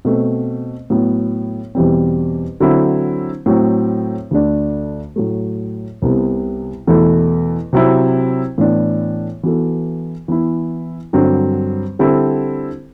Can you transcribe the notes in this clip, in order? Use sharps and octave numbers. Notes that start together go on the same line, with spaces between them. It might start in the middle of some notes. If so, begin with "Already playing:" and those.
B2 A3 C4
A2 F#3 B3
E2 B2 G3 C4
D3 F#3 C4 E4
A2 F#3 C4
D2 D3 A3 D4
A2 F#3 A3
C2 C3 G3 B3
E2 B2 A3 E4 A4
C3 F#3 C4 E4
A2 E3 B3 D4
E3 B3 F#4 A4
E3 B3 E4
G2 D3 F#3 C4
D3 G3 C4 E4 A4